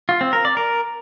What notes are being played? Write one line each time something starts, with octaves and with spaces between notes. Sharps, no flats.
F4
C4
A#4
D5
A#4